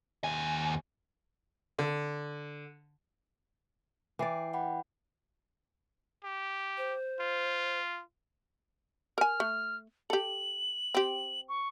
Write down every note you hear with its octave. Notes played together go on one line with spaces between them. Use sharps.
D#2 G#5
D3
E3 D5 G5 C7
F#5 G5 B5
G4
C5
F4
A#4 G#5 F6
A3
G4 A4 F#7
C4 G4
C#6